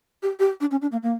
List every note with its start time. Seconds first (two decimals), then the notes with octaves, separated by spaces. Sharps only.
0.23 G4
0.40 G4
0.61 D4
0.71 C#4
0.82 D4
0.92 A#3
1.03 A#3